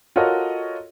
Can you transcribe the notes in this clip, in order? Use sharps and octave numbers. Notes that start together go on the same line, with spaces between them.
F4 F#4 A4 A#4 C#5 D#5